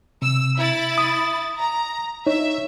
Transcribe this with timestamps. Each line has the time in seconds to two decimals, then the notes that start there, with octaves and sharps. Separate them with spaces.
0.22 C3 E6
0.56 E4 B5 A6
0.98 D#6
1.59 A#5
2.27 D#4 C#5 E5